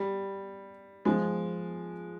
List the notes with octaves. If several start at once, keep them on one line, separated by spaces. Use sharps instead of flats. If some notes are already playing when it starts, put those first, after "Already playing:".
Already playing: G3
F3 G#3